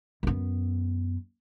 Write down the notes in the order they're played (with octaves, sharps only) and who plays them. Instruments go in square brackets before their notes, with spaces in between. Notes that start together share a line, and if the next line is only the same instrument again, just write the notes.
[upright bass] F#2 B3